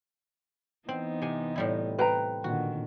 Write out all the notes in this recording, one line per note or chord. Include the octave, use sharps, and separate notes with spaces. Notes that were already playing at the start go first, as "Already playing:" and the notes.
E3 B3 C4 D#4
C3 G#5
A2 G3 E4
C4 B4 G5 A#5
A#2 D3 D#3 F#4